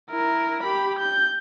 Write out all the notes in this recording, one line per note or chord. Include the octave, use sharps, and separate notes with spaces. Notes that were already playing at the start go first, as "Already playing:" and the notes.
E4 A#4
G4 B5
G6